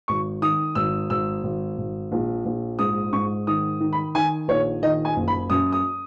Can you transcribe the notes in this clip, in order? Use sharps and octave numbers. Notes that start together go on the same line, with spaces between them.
G#1 C#6
D#3 D#6
G#1 E6
G#1 E6
G#1
G#1
A#1
A#1
G#2 D#6
G#2 C#6
D#3 D#6
D#3
B5
D#3 G#5
A#1 C#5
D#3 D#5
G#5
F#1
B5
F#2 D#6
D#6